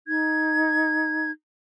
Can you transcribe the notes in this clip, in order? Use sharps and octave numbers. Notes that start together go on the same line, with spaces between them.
D#4 G#6